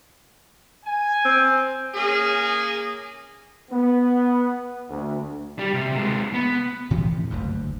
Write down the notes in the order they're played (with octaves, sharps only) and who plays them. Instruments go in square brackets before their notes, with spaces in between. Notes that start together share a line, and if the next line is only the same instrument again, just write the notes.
[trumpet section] G#5
[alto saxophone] C4
[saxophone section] A#3 C#4 G#4
[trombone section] B3
D2
[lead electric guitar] G3 G4
C3
C3 G#3
B3
[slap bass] A2 E3 F3 C4
F#1 D2 G2